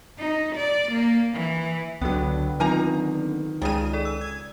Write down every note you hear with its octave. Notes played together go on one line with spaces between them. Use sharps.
D#4
D5
A#3
E3
C#2 D3 F#3 B3 G5
D#3 F#3 C4 F4 A#4 G#5 A#5
C#2 C#3 G3 G#3 G#4 D#6 D#7
A4 D5
E6
G#6